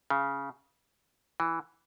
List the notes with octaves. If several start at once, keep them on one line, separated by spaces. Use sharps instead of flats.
C#3
E3